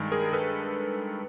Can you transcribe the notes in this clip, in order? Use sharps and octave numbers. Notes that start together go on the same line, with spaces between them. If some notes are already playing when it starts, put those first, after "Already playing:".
Already playing: G2 D#3 G#3
G#4 A#4
A4 B4